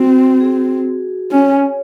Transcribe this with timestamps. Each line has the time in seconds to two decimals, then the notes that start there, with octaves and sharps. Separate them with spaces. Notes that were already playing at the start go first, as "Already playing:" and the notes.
Already playing: C4 F#4
0.41 G#4
1.31 C#4 C#5